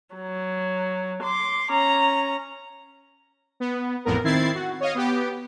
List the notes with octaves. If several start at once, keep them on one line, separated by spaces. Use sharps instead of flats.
F#3
C6 D6
C#4 A#5
B3
A1 F2 A2 B3 A#4
D#3 C4 E4 G#6 A6 C7
F#4
C#5 D#5 F5
B3 G4